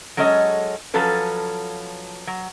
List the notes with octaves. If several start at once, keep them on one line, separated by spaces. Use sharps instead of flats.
F#3 G#3 C#4 A4 D#5
F3 F#3 C#4 A4 B4
F#3